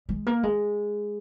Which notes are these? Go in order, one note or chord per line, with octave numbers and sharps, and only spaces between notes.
G#3
A#3
G#3